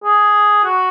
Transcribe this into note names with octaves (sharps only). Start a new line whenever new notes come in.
G#4
F#4